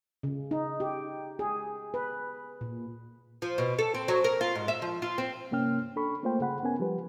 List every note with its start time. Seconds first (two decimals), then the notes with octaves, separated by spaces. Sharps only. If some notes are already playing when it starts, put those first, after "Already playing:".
0.23 C#3
0.51 D#4
0.80 G4
1.39 G#4
1.94 B4
2.61 A#2
3.42 F3
3.58 B2
3.79 A4
3.94 C4
4.08 F#3
4.24 A#4
4.41 F4
4.55 G#2
4.68 E5
4.82 F3
5.02 F4
5.18 C4
5.51 G2 C3 A#3 C#4 G5 F6
5.96 D4 A4 B5 C#6
6.23 A3 A#3 F4 C5 G5
6.39 G2 C#3 G#4 F#5 B5
6.63 B3 C#4 A#4 G#5
6.80 F3 G3 G4 B4